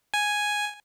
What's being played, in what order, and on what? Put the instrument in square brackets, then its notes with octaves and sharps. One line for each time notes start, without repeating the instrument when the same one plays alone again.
[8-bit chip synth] G#5